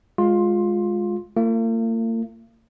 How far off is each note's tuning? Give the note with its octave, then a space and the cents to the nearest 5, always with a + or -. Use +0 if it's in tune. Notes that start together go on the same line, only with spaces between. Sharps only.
G#3 +0 F4 +15 C6 +10
A#3 -45 F4 -30